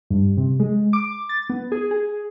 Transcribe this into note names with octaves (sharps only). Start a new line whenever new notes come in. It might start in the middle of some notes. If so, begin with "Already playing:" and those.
G2
C3
G#3
D6
A6
B3
G#4
G#4